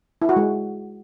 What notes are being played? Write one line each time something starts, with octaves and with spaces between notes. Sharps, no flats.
E4
F#4
G#3